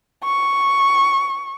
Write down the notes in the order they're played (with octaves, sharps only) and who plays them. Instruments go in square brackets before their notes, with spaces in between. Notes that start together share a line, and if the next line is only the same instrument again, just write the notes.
[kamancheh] C#6